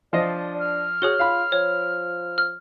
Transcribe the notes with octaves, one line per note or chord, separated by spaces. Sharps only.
F3 D4 C5 D5 D#5
F6
F#4 G#4 C#5 G7
F4 F5 B5
F3 C#5
F6